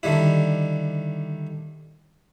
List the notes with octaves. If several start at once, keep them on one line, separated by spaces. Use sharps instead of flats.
D3 D#3 G3 E4